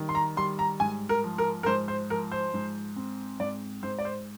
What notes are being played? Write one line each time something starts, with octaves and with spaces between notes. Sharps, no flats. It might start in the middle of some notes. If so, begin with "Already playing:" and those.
Already playing: D#3 G3
C6
A#5
G3 C6
A#5
G#2 G#5
A#4
F3
A#4
A#4
G#2 C5
C5
F3 A#4
C5
G#2
C4
G#2 D5
G#2 C5
D5
C5